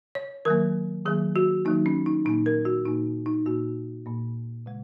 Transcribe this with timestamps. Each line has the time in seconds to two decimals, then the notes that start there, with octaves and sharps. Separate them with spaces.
0.15 C#5
0.45 D#3 F#3 A#3 A#4
1.06 D#3 F#3 A#3 G#4
1.36 F#4
1.65 D#3 F#3 A#3 D#4
1.86 C#4
2.06 D#4
2.25 A#2 A#3 D#4
2.46 A#4
2.65 F#4
2.85 A#2 A#3 D#4
3.26 D#4
3.46 A#2 A#3 F#4
4.06 A#2 A#3
4.66 C#3 G#3